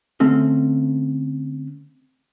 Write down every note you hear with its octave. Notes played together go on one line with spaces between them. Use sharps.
D3 A3 C4 C#4